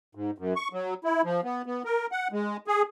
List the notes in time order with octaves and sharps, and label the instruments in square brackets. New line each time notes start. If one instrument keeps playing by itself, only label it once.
[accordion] G#2
F#2
C#6
F#3
E4
F3
B3
B3
A#4
F#5
G#3
G#4